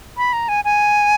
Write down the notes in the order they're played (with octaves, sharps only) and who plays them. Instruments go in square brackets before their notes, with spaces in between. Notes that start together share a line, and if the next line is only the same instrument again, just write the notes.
[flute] B5
A#5
G#5
G#5